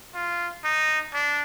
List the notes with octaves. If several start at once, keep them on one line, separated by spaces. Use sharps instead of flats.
F4
D#4
D4